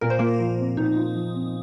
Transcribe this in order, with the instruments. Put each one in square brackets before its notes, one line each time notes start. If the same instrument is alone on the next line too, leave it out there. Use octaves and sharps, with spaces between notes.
[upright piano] A#2 [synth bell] A#4
[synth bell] C5
[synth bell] A#3 A#4 [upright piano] F4
[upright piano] F3
C4
[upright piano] A#2 [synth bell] D#4
[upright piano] F4
F3
C4